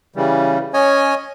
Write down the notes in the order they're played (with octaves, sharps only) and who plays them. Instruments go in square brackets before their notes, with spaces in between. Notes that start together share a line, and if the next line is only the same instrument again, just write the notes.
[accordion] C#3 E3 G3
[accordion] C#4 [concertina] C#5 D#5 G#5